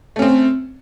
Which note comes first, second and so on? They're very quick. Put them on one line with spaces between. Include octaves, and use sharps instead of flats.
A3 C#4 C4